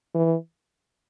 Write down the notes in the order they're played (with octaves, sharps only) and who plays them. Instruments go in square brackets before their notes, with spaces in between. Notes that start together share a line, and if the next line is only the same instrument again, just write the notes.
[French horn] E3